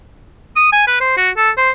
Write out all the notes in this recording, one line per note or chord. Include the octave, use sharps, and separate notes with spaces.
D#6
G#5
B4
C5
F#4
A4
C5